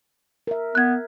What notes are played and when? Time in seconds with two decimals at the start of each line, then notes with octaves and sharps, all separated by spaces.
0.47 A#4 E5
0.75 B3 F#6 G#6